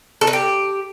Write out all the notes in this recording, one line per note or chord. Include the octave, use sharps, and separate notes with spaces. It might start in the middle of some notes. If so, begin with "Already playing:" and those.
A4
B4
G4